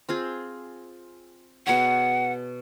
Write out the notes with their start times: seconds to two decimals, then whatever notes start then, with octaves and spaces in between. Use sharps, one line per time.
0.09 C4 F4 G#4
1.66 B2 G#4 C#5 F#5